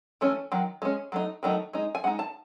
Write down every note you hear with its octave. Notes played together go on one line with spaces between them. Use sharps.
E3 A3 C#4
D#3 F#3
G#3 C#4
F#3 A3 D#4
D#3 F#3 A3 D#4
G#3 D#4
G#5
G#3 D#4 F#5
A5